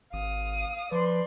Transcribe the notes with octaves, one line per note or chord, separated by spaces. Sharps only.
G#1 F5 D#6
F3 B4 D5 C6